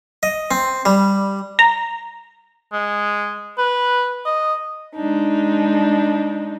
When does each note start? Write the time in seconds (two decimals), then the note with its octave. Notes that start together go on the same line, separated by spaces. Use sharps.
0.23 D#5
0.51 C4
0.85 G3
1.59 A#5
2.72 G#3
3.58 B4
4.25 D#5
4.95 G#3 D4 D#4